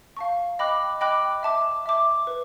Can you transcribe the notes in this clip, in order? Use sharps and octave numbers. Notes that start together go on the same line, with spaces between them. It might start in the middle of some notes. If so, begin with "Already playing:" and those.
F5 A5 C#6
D#5 G5 B5 D6 F#6
D#5 G5 B5 D6 F#6
E5 A5 D6
E5 A5 D6
B4